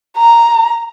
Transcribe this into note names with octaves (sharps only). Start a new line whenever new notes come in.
A#5